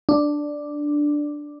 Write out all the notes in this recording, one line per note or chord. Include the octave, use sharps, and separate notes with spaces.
D4